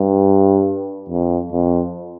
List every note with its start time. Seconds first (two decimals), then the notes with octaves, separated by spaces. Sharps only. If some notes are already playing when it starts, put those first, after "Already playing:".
Already playing: G2
1.09 F2
1.52 F2